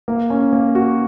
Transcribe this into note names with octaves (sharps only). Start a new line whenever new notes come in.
A#3
C#4
A#3
F#4